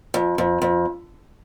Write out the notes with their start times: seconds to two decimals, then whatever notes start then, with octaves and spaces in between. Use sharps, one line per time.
0.14 F2
0.38 F2
0.62 F2